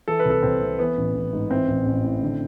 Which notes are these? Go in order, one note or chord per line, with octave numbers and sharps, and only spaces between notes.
E3 A4
B4
C2 A4
C2 C4
C3
E3 B3
A1
A1
G#2
E3 C4
A1
A1
A2
D3